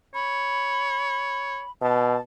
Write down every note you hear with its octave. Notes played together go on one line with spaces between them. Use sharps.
C#5 B5
B2 A5